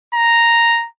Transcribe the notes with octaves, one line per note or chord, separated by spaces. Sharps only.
A#5